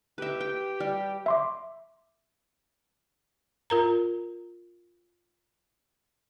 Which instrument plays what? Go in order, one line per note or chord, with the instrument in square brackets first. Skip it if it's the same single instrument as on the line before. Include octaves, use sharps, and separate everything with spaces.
[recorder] G4 [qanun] B4 E5
[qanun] G5
G3
[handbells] E5 C6 D6
[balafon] F4 A#4 A#5